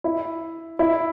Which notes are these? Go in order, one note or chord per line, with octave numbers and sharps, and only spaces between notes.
E4
E4